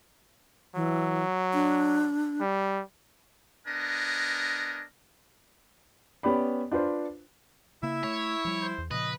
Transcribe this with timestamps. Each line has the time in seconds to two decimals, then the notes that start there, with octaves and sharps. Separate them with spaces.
0.75 E3 F#3
1.54 D4
2.40 G3
3.67 B3 D4 A#4 D#5 G#5
6.23 B3 C#4 G4 D5 B5
6.72 D4 F4 B4 C5
7.83 C#3 A#3 E4 E5
8.04 A3 C#5
8.45 F3 G3
8.62 C5
8.78 E2
8.91 A#2 C#3 F3 B4 D#5